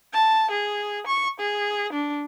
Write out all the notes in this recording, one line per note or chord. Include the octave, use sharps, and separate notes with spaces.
A5
G#4
C#6
G#4
D4